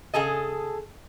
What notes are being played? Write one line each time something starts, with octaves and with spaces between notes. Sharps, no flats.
C#3 G#4 A4 D#5